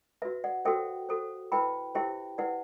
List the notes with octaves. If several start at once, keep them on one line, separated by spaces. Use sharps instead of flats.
F#4 B4 E5
D5 F#5
F#4 A4 C5 E5 G5
F#4 A4 C5
E4 B4 G5 B5
E4 G4 C5 E5 G5
E4 B4 D5 F#5